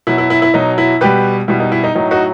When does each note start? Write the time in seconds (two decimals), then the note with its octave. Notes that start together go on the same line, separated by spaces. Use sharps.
0.07 B2 F#3 E4
0.18 E4
0.30 E4
0.42 E4
0.54 B2 F#3 D#4
0.78 E4
1.01 B2 G3 G4 B4
1.48 B2 G3 E4
1.60 D#4
1.72 E4
1.84 D#4
1.95 A2 F#3 D#4
2.11 D#4 F#4